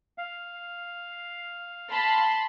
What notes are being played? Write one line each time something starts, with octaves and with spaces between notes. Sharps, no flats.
F5
A5 B5 C6